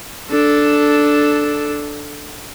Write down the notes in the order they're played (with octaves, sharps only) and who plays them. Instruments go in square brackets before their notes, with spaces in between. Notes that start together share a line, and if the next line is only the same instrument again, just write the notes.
[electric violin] D4 A4